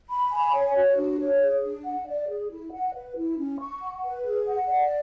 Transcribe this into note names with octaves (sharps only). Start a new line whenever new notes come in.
B5
G#5
C#5
F#4
D4
C#5
G#4
D4
F#5
D5
G#4
E4
F#5
B4
E4
C#4
C#6
F#5
B4
G#4
F#5
D5